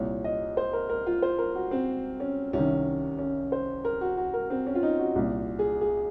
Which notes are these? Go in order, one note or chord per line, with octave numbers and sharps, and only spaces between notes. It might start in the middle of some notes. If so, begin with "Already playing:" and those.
Already playing: C2 A#2 C#5
D#5
C5
A#4
A#4
F4
C5
A#4
F#4
C4
C#4
C2 C3 D#3 C#4
C#4
C5
A#4
F#4
F#4
A#4
C4
C#4
F4
D#4
F#4
C2 A#2
G#4
G#4